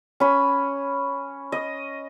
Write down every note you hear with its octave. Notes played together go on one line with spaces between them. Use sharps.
C#4 B5
D#5